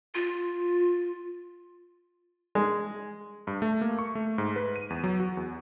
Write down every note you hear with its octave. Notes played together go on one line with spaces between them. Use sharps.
F4
G#3
G2
A3
A#3
C#6
A3
G#2
B4
D#7
E2
F#3
F#4
E2